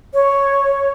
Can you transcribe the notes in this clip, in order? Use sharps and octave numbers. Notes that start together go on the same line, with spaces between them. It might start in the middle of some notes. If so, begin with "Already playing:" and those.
C#5